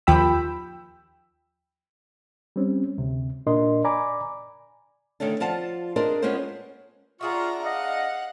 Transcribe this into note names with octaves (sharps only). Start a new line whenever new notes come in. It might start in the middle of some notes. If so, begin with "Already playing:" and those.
D#2 F3 G5 B5 E6
G3 C4 C#4
D2 C3
A#2 D4 A#4 D#5 C6
D5 G#5 A#5 B5 D6
D3 D#3 A3 C#4 D4
F3 F4 D5 F#5 A5
D4 G#4 A#4 C5 D5 D#5
G#3 B3 C#4 F4 A#4 C5
D4 F4 G#4 E5 F#5 A#5 C#6
D#5 F5 F#5